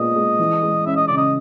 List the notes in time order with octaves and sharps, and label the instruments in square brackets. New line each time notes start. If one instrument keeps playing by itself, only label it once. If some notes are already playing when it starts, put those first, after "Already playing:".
Already playing: [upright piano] A#2 G#3 B3 [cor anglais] D#5
[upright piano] G#3
E3
G#3
[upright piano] C#4 [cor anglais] E5
[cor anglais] D#5
[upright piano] C#3 [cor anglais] D5
[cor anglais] D#5